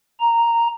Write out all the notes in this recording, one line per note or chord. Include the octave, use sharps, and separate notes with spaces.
A#5